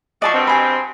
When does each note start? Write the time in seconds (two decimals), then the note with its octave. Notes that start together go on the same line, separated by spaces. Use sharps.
0.22 F3 F#3 D5 D#5 A5 C#6
0.34 G2 B2 C4
0.47 G4 G#5 B5